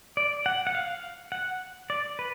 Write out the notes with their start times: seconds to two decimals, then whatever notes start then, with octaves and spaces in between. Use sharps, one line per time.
0.17 D5
0.46 F#5
0.67 F#5
0.75 F5
1.32 F#5
1.90 D5
2.19 B4